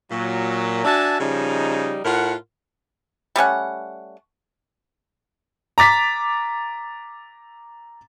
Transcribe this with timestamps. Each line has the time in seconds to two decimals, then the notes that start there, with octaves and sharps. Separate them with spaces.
0.11 A#2 F#3
0.85 D4 F#4 E5 G#5 A5
1.20 C#3 F3 G3 D#4
2.05 A2 F4 A#4 F#5
3.36 G3 A3 C#4 F#5
5.78 A#5 D6 A6 B6